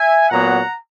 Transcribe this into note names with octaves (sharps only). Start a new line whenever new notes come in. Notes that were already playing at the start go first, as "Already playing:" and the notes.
Already playing: E5 G#5
A#2 F#3 B3 F#5 A#5